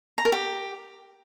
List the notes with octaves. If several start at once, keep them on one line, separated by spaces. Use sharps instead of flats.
A#5
A#4
G4